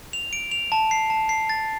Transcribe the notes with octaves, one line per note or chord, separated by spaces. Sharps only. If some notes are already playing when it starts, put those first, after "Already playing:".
F7
D7
F7
A5
C7
A5
C7
A6